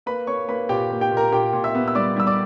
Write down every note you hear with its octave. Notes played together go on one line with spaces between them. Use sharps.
A#3 B4 B5
A#3 C#5 C#6
A#3 B4 B5
A#2 G4 G5
A#3
G4 G5
A#2
A#4 A#5
A#2 G4 G5
A#2
E5 E6
B3
E6
G3 D5 D6
G3 E6
D5 D6